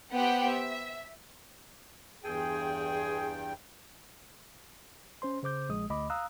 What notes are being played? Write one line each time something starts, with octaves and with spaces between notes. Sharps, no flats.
B3 G4 C5 F#5 G5
E5
E2 G2 G#4 G5
C#4 C5 C6
C#3 C5 D6 G6
A#1 G#3 D#6
D2 D#5 B5 D6
F5 A#5 D#6 E6 F#6